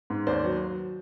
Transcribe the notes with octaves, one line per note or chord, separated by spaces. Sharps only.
G#2
D#2 C5 D5
F#3